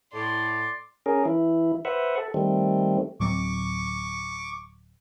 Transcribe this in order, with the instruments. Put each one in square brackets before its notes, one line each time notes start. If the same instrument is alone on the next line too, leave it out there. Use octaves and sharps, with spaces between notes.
[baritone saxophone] A2 [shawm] D5 [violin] C6
[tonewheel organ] C#4 G#4 A#4
E3 E4
B4 C5 E5 F#5
A4
D#3 G3 A3 C4
[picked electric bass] D1 F#3 C4 [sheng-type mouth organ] C#6 D6